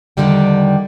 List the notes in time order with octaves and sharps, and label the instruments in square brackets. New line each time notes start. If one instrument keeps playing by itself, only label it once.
[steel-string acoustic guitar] E2 G2 D3 D#3 G3 G5